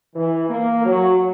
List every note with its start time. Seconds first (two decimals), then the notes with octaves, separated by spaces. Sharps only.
0.15 E3
0.50 A#3
0.85 F#3